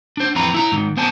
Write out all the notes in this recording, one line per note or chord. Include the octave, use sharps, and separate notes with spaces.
D4 C5
F2 E3 C4 B4 A#5
E4 A#5
G#2 D#3
B3 C5 G#5 A5